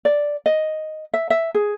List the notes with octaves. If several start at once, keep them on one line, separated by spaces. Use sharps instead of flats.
D5
D#5
E5
E5
G#4